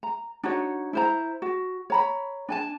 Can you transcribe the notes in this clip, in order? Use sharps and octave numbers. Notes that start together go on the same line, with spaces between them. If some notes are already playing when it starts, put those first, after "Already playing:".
A#5
D4 D#4 F#4 C#5
E4 C5 A#5
F#4
C#5 A#5 B5
D4 G#5 A5